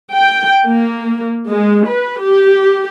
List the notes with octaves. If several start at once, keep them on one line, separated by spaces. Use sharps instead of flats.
G5
A#3
G#3
B4
G4